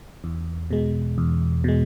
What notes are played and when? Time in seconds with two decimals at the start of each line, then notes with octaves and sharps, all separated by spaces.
0.24 E2
0.71 B2 G#3
1.18 E2
1.64 B2 G#3